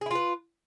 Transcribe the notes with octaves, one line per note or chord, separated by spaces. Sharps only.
E4 F4 G#4 B4